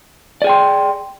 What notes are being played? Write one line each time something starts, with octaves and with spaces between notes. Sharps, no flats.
G#4 D5 G5 C6